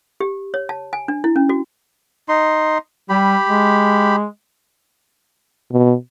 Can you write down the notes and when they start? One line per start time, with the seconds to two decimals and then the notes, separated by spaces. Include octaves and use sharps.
0.20 G4
0.54 C#5
0.69 A5
0.93 G#5
1.08 D4
1.24 E4
1.36 C#4
1.49 F#4
2.29 D#4 C6
3.09 G3 G4 B5
3.48 G#3
5.72 B2